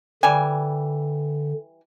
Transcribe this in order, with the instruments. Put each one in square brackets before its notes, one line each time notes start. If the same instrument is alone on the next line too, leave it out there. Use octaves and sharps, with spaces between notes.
[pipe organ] D3 [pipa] E3 G3 G#5